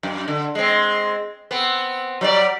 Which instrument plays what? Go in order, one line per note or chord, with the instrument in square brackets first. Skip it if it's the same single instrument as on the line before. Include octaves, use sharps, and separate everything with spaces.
[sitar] F#2
D3
G#3 C4
B3 C4
F#3 G3 D5